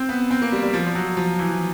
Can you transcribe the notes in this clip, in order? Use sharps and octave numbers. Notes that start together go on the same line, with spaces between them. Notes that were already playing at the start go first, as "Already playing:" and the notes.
Already playing: C4
B3
C4
A#3
G3
G3
F3
F3
F#3
F3
E3